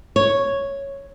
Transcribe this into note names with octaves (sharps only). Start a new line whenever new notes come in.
C#5